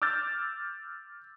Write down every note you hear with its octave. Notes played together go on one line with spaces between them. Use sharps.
D6 E6 F6 G6 A6